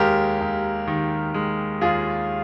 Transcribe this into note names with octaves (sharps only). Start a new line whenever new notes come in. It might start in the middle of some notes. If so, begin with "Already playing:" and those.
Already playing: D#2 G#3 G4 A#4
D#2
D#3
G#3
D#2 F4 G#4